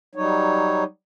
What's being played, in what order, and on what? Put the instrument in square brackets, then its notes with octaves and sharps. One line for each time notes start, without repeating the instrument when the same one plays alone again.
[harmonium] F#3 G3 D#4 C#5